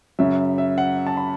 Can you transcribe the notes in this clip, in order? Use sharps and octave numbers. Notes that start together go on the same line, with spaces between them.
F#2 C#3 F#3 E5
E5
F#5
A5
B5